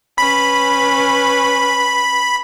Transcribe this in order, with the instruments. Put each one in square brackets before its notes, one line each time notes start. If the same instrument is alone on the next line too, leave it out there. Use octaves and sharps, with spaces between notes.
[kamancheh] C#4 B4 [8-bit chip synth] B5